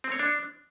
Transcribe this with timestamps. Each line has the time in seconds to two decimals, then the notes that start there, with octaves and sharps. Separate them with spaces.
0.04 C4
0.12 C#5
0.19 D4